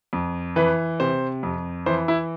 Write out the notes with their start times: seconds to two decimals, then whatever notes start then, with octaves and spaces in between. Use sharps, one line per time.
0.13 F2
0.56 E3 B4
1.00 C3 C5
1.43 F2
1.86 E3 C5
2.08 E4